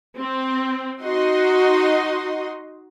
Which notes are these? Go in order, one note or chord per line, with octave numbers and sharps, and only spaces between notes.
C4
D#4 F#4 D#5 C6